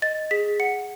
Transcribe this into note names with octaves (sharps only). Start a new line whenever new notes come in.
D#5 A6
G#4 B6
F#5 C#7